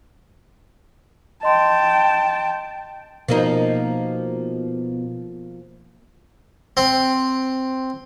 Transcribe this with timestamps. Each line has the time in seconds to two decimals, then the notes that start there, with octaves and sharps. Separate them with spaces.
1.43 D#5 G5 A5 C6
3.28 B2 F3 A#3 D#4
6.77 C4